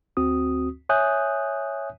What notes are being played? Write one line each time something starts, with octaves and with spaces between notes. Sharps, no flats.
D2 C4 F#4 D#6
C#5 E5 G#5 D#6 F#6 G6